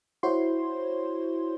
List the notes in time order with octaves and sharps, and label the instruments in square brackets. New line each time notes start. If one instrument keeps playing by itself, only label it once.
[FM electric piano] E4 F#4 C5 C#5 C6